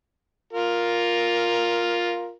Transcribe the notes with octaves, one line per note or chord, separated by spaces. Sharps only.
F4 A#4